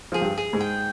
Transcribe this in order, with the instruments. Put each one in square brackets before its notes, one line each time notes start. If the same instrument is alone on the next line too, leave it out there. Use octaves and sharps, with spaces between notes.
[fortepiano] F3 [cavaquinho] G#4
[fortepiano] G2 G3
[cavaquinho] G#4
[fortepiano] G#2 G#3
[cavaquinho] G5